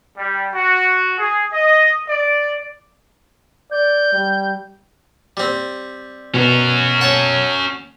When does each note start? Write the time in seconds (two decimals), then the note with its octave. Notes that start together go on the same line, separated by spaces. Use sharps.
0.17 G3
0.54 F#4
1.18 G#4
1.52 D#5
2.07 D5
3.71 D5 G6
4.13 G3
5.37 G3 C4
6.34 B2 C#4 F#4
7.01 A4 C#5 F#5